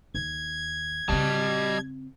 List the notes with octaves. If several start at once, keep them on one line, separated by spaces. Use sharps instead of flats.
D#2 G#6
C#3 G3 C4 D#5 A5